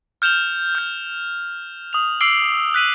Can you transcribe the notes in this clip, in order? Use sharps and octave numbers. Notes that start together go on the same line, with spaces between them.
F6 G6 E7 F7 G7
F6 G6
D#6 F7
D6 E6 C7 D7 F#7 G7
F#6 B6 D#7 F#7